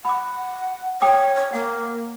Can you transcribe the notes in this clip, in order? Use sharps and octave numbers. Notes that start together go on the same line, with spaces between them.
F#5 B5 D6
A4 C#5 G5 D6
C#5
A#3 F#5